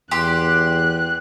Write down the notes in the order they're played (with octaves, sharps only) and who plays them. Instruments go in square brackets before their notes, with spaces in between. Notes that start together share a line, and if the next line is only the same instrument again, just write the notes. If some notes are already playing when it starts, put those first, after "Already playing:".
[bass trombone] E2 [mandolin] G4 C6 [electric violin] F#6